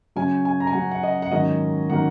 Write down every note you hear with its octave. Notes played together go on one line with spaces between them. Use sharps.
C#3 F#3 C#4 G#5
G#5
A#5
G#5
C#3 F#3 C#4 F#5
F#5
D#5
F#5
G#2 D#3 F#3 A#3 C#4 D#5
D#3 F#3 A#3 C#4 F#5